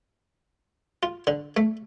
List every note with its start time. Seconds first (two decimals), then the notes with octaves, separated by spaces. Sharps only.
1.03 F4
1.27 D3
1.57 A3